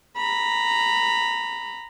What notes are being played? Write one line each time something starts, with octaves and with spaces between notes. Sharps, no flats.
A#5 B5